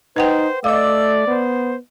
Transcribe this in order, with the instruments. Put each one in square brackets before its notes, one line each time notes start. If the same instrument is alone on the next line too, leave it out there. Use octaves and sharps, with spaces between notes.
[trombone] D#4 [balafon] B4 F#5 G5 [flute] C5
[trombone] A3 [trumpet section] D5 [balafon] D#5 F5 [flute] E6
[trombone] B3 [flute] C5